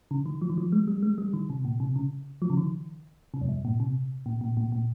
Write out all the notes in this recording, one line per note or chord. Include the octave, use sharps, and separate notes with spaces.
C#3
D#3
F3
D#3
F3
G#3
G3
G#3
G3
D#3
C3
A#2
C3
C#3
F3
C#3
D#3
C3
F2
G2
A#2
C3
A#2
A#2
A#2
A#2